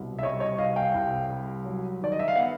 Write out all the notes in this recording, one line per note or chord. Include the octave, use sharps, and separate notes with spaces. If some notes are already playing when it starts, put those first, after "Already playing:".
Already playing: C2 B2
E5
G3 C#5 D#5
C#5 D#5
C2 D#5 F5
F5 G5
C2
G3
F#3
D#3 D5
D#5
E5
F5
B3 E5 F#5